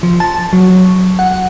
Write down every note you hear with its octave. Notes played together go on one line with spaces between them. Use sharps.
F3
A5
F#3
F#5